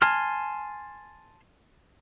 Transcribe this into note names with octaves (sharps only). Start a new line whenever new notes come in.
G#5 A5 C6 F6